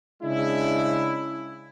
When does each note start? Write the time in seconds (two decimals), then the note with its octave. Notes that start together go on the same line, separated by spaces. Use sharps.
0.23 C#3 G#3 D4 E4